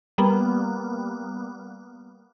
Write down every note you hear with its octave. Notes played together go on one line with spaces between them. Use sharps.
G3 A#3 B3